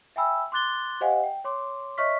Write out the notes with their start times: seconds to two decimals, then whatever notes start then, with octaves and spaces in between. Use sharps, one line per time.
0.16 E5 G5 G#5 B5 E6
0.52 C6 D6 F#6 A6 G7
1.01 G4 C5 D#5 F5 F#5 G#5
1.23 G5
1.44 C#5 C6 D6
1.98 C#5 D#5 E5 C#6 F6 B6